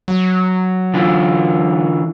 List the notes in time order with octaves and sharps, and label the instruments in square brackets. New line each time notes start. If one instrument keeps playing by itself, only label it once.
[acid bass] F#3
[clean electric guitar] D3 E3 F4